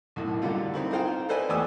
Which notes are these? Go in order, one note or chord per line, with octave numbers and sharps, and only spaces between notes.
B1 F#2 A2
F#2 D3 F#3 G3 F4
C4 D#4 E4
D#4 F4 G#4 C5 F5 G5
A4 B4 C5 D5 D#5 G#5
E2 A3 G4 G#5 D#6 E6